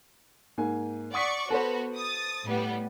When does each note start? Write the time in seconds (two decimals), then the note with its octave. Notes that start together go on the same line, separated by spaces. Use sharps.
0.58 G#2 A#3 G#5
1.13 D5 F#5 C#6 D#6 B6
1.50 B3 F#4 A4 C5
1.95 D#6 A6
2.45 A2 G3 B3